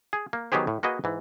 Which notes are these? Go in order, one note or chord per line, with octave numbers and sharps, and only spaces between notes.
G#4
A#3
D#3 F#3 B3 G4 G#4 C5
A2
A#3 F#4 G#4 B4 D#5
G#2 E3